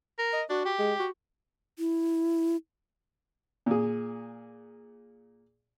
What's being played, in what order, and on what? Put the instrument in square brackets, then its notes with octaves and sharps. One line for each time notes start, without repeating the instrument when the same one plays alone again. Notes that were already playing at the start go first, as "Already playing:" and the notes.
[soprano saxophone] A#4
[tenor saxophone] D#5
[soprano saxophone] D4 [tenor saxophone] F#4
[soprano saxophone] G4
[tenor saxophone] G#3
F#4
[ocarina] E4
[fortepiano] A#2 G#4